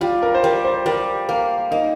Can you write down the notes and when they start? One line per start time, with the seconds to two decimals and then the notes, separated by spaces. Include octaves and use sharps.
0.01 G3 F4
0.23 A#4
0.34 C5
0.43 G3 A#4
0.65 C5
0.86 G3 A#4
1.29 A#3 A#4
1.71 A#3 D#4